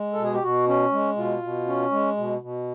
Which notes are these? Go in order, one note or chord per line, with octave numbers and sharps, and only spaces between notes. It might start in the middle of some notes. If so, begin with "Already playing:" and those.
Already playing: G#3
B2 A4
G#4
G4
B2 F#4
C#4
G#3
B2 F4
B2
C#4
G#3
B2
B2